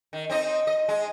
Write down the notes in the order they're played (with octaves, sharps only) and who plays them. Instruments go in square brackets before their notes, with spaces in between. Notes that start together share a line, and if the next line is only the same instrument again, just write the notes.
[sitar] D#3
C4 D#4 D#5
D#5
G#3